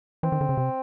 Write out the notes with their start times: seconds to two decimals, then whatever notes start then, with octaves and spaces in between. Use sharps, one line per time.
0.23 E3 C4
0.32 D#3
0.41 D3
0.49 C#3
0.57 C3